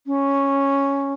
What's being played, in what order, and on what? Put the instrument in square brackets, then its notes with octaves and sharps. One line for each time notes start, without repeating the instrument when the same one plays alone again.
[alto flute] C#4